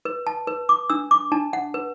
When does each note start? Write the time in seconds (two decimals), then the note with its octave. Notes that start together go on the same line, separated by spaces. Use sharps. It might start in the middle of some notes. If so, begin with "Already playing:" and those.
0.05 B4
0.27 A5
0.47 B4
0.69 D6
0.90 D4 E6
1.11 D6
1.32 D4 A5
1.53 F#5
1.74 B4